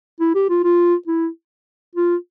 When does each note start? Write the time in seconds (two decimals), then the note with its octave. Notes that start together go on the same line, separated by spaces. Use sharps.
0.20 E4
0.35 G4
0.50 F4
0.64 F4
1.07 E4
1.95 F4